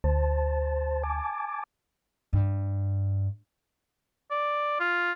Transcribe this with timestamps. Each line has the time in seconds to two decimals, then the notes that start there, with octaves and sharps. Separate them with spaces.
0.04 D2 C5 A5
1.03 G#5 A5 D6
2.33 G2
4.31 D5
4.80 F4